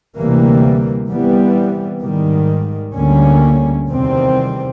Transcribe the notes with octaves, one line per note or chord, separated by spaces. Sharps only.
D2 C3 E3 G3 A#3
C3 E3 G3 B3
G#2 D#3 G3
D2 D3 G3 A#3 C#4
E2 C3 D#3 G3 C4